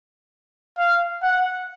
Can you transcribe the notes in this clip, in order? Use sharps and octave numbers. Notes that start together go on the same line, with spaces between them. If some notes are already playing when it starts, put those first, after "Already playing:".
F5
F#5